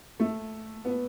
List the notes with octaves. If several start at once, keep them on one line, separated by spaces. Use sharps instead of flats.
A3
B3